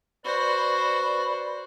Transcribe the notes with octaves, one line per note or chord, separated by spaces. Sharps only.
F#4 B4 C5 D5 B5